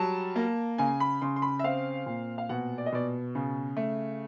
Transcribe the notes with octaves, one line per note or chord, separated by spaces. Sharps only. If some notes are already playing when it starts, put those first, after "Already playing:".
Already playing: F#3 G3 A5
A#3
C#3 G#5
B5
C#3 C6
C6
B5
E5
C4 F5
A#2
F5
B2 F#5
D5
D#5
B2 D5
C#3
A3